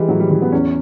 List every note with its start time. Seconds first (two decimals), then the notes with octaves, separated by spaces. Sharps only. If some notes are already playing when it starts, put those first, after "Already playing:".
Already playing: E3 G3 G#3
0.08 A2 F#3
0.20 G3
0.30 E3 G3
0.42 B3
0.52 E2 C#4